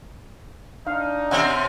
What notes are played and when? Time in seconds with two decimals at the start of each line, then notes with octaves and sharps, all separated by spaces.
0.87 D4 D#4 F5
1.31 B2 C4 C#4 E5 F#5 G#5